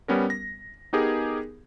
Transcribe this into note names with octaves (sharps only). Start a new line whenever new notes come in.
G3 B3 C#4 A#4
A#6
B3 D#4 G4 G#4 A#4